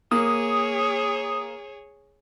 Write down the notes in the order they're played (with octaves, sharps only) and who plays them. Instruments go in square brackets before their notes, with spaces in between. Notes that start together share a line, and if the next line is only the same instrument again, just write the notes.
[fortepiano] A#3 [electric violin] G#4 C#5 [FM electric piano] D#6